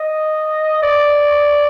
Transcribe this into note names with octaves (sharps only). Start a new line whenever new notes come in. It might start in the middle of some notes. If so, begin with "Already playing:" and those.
Already playing: D#5
D5